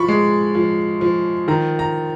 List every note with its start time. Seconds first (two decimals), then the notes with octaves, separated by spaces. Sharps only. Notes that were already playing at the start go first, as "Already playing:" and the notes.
Already playing: F3 B5 C#6
0.08 G#3
0.55 F3
1.01 F3
1.48 D#3 A#5
1.79 A#5